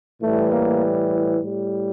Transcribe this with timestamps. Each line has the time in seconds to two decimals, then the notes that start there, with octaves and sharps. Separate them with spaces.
0.21 A2 E3 G3 A3
0.51 A#3
1.42 A2 G3